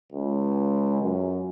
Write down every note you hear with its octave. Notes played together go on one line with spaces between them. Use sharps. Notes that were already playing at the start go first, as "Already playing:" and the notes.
C#2
F#2